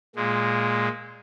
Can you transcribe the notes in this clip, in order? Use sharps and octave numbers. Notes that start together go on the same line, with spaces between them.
A#2 G#3